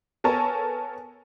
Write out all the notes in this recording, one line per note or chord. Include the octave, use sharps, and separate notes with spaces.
B3 A4 A#4 C#5 G#5 A5